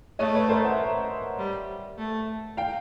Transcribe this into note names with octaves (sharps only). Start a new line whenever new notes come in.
A3 C#5 D#5
B4 C#5
A#4 C5
E5 F#5
G3
A3
F5 G5